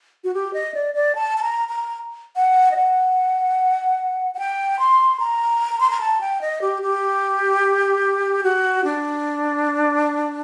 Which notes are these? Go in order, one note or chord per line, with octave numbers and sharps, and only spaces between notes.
F#4
G4
D#5
D5
D5
A5
A5
A#5
A#5
F#5
D#5
F#5
F#5
G5
C6
A#5
C6
A#5
A5
G5
D#5
G4
G4
F#4
D4